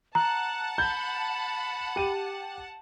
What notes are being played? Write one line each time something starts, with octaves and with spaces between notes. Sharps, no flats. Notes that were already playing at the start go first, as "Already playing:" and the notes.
F#5 A5 A#5 F#6
B5 G6
G4 D#7